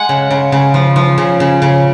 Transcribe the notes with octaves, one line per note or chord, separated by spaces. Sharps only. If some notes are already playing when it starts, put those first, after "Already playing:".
Already playing: G#3 F#5 G#5
C#3
C#3
C#3
F3
F3
C#3
C#3
C#3